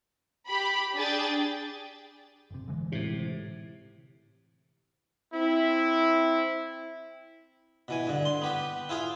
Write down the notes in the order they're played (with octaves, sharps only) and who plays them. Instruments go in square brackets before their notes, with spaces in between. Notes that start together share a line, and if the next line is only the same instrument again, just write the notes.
[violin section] G4 B5
D4 G#4 G5 A6
[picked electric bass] G1 C3
D3 E3 G#3
[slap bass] A2 C3
[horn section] C4 E4
[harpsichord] B2 E3 G#5
G2 D3
C6
B3 G4 B4
E4 F4 G#4 F5